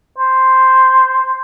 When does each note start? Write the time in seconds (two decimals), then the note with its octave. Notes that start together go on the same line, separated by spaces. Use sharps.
0.18 C5